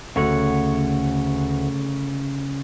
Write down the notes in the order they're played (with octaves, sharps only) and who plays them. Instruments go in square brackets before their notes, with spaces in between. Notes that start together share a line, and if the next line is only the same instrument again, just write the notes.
[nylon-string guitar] D2 [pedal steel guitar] C#3 C#5 F#5